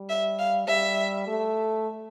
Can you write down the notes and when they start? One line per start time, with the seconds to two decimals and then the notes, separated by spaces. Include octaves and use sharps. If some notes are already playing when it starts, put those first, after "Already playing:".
Already playing: G3
0.09 E5
0.39 F5
0.68 G3 E5
1.27 A3